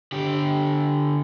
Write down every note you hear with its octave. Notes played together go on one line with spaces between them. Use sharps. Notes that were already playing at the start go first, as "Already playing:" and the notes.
D3 G4